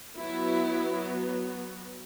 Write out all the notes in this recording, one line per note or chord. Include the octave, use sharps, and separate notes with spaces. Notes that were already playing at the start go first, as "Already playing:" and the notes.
F#3 B3 E4